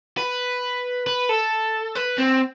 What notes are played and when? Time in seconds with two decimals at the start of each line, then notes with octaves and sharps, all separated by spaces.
0.17 B4
1.07 B4
1.29 A4
1.96 B4
2.18 C4